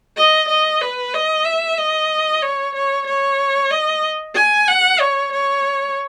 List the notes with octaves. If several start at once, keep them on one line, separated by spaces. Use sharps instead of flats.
D#5
D#5
B4
D#5
E5
D#5
C#5
C#5
C#5
D#5
G#5
F#5
C#5
C#5